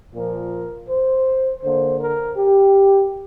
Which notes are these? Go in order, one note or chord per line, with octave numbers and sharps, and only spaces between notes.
A#2 F3 A#3 A#4
C5
D3 A#3 C5
A#4
G4